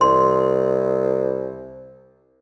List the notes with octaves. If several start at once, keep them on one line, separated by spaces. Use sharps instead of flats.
C2 C6